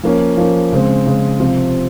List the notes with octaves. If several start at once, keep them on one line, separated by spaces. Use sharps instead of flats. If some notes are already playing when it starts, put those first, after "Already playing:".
F3 A#3 C#4
F3 A#3 C#4
C#3 G#3 C4
C#3 G#3 C4
C3 F3 C4 F4